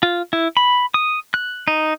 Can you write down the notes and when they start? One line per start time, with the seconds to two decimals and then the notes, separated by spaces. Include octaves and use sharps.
0.03 F4
0.33 E4
0.57 B5
0.94 D#6
1.34 F#6
1.68 D#4